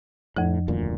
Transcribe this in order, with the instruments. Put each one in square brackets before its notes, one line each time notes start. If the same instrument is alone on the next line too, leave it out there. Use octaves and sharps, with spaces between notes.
[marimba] F2 F3 [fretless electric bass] A2
[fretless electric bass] D#1 D2 A#2